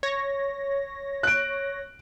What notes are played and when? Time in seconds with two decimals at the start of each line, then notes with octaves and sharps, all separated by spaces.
0.03 C#5 A#6
1.23 F#6 D7